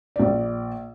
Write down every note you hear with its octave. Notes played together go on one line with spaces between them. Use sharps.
A#1 D5